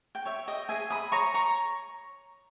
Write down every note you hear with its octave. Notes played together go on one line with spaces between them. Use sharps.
G5
C#5 E5
D#5 G5
G#4 E5 G#5
B5 D#6
C#5 A#5 C#6
A#5 C#6